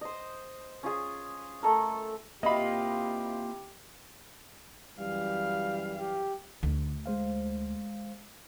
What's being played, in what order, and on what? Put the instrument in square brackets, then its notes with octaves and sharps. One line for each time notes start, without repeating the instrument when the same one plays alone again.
[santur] C5 D#5
C#4 F4 G#4
A3 A4 A#4
[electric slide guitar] A#3 F4 [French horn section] C4 E4 G4 [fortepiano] D#5 E5 B5
[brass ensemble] F#2 E3 G3 [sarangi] F5
[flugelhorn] G4
[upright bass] D2 A3 [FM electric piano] D3
[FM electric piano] G#3 C5 F5